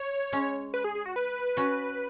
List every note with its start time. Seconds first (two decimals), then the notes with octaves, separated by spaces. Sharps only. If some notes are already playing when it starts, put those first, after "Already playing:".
Already playing: C#5
0.33 G#3 C#4
0.74 B4
0.84 G#4
0.95 G#4
1.06 F#4
1.16 B4
1.57 C#4 F#4